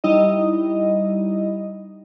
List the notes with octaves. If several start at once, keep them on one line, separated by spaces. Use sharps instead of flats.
G3 D#4 E4 D#5